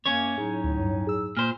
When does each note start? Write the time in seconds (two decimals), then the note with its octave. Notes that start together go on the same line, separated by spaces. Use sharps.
0.06 F#2 A#3 C#4 C#5
0.38 A2 F#3 D#4 G#4
0.64 D2
0.79 G2
1.07 G#4 E6
1.37 A#2 C5 F6